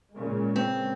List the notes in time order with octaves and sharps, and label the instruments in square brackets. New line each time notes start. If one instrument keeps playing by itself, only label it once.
[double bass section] A#2 C#3 G#3
[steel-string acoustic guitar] C4